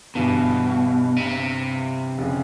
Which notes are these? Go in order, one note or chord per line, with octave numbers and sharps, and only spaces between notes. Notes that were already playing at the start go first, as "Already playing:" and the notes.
G1 G2 B2 E3
C3
F1 C#3